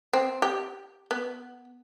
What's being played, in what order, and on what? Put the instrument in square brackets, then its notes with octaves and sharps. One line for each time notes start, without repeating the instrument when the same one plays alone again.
[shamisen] C4
G4
B3